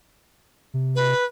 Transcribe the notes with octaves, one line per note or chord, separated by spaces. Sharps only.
C3
B4